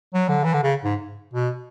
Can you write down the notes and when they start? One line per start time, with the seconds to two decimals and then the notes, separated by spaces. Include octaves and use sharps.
0.14 F#3
0.29 D3
0.44 E3
0.54 D3
0.64 C#3
0.84 G#2
1.34 B2